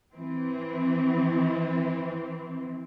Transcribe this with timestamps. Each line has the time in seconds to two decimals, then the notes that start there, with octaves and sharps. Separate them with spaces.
0.13 E3 C4